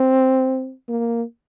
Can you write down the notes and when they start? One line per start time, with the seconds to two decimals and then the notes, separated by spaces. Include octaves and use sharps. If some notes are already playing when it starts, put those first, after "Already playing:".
Already playing: C4
0.89 A#3